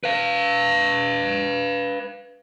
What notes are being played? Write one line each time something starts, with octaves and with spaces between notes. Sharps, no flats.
B4 F5